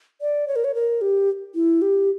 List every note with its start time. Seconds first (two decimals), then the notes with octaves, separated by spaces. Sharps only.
0.21 D5
0.48 C#5
0.56 A#4
0.64 C#5
0.75 A#4
1.01 G4
1.55 E4
1.82 G4